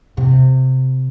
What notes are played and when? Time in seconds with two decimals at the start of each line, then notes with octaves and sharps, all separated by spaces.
0.17 C3